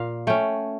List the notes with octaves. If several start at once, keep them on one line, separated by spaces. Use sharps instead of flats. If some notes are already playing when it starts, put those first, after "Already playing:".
Already playing: A#2 F5
A3 C#4 G5